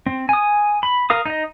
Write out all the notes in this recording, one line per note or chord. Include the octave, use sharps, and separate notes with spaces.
C4
G#5 D#6
B5
A#4 F5 D#6
D#4 D#5